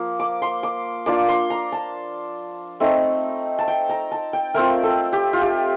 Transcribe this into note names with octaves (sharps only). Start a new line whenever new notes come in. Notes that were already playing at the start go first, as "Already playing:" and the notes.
Already playing: F3 A#3
D6
C6
D6
A#3 D4 F4 D6
C6
A#5
A5
A3 C4 D#4
A5
G5
A#5
A5
G5
A3 C4 F4 A#4
A4
G4
F4
G4